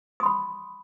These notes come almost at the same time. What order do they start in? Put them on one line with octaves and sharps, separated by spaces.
D#6 C6 B5